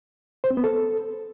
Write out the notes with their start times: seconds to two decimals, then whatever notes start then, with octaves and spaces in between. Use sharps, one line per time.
0.44 C5
0.50 C4
0.57 B3
0.64 A4